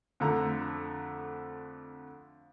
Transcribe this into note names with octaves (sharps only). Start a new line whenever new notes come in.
F2 D3 A3 A#5